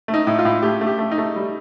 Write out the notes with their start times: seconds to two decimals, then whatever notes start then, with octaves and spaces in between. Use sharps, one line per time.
0.08 A3
0.14 D#4
0.27 A2
0.39 F4
0.45 A2
0.62 A3 G4
0.81 A3
0.86 G4
0.99 A3
1.11 D#4
1.18 A3
1.36 G3